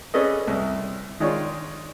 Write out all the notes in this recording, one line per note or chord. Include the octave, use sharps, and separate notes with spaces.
C#4 G#4 A4 B4 D5 D#5
C2
D#3 G#3 D4 F4 C#5